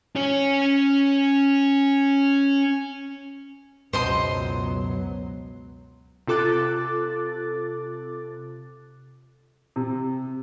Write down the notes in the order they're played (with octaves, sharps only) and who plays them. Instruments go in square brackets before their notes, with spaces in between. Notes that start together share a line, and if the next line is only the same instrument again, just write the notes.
[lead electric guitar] C#4 C#5
[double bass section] C#2 F#3 B3 [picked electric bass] F#2 B2 [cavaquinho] C5 D#5 C6
[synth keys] C3 F4 A4 D6 F#6 A6
[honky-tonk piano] C3